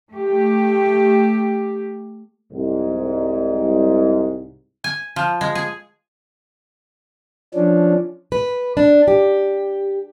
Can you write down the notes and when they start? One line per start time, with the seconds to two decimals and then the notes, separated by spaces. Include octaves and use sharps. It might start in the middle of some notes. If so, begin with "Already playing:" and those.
0.12 A3 G4
2.52 C2 G#2
4.84 G#5
5.16 F3
5.41 G#3
5.55 G#4
7.54 F3 C#4 D4
8.32 B4
8.77 D4
9.08 G4